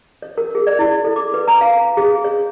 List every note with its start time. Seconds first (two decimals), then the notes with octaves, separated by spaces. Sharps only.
0.22 C#5
0.38 A#4
0.55 G#4
0.67 D5
0.79 E4
1.04 A4
1.16 D6
1.34 B4
1.48 A#5
1.61 F5
1.97 G#4
2.24 C#5